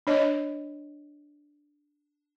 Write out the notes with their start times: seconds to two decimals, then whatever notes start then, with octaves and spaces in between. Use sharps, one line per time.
0.07 D4 C#5 D#5